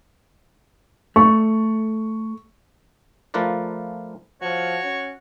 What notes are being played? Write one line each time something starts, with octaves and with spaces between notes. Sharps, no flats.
A3 C#6
F3 A3 F4 A#4 B4 D5
F3 F#4 C#5
C#4